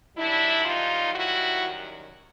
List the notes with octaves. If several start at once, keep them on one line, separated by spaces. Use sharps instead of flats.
F#2 D#3 G3 D4 E4
D#4 F4
E4 F#4